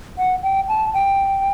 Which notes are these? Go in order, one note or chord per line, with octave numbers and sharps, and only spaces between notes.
F#5
G5
A5
G5